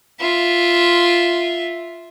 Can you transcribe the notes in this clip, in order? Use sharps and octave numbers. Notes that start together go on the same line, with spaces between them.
F4 E5